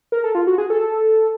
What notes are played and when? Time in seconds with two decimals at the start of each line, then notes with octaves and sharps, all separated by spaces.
0.12 A#4
0.24 A4
0.35 F4
0.47 F#4
0.58 G#4
0.70 A4